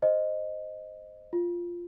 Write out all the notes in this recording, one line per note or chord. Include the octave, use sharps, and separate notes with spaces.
C5 D#5
F4